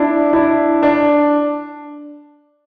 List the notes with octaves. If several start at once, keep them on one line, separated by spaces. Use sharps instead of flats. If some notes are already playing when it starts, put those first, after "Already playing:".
Already playing: D4 E4
D4 E4
D4